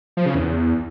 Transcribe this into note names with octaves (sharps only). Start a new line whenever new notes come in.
F3
C#3
E2